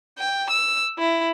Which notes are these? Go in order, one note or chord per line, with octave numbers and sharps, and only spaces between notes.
G5
E6
E4